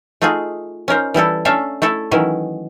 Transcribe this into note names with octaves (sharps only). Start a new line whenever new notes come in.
A3 D#4 F4 F#4 G#4
C#4 D#4 A#4 C5
E3 G3 E4 A4
A3 C#4 D4 A4 E5 F5
A3 E4 A4
D#3 E3 F#3 C#4 E4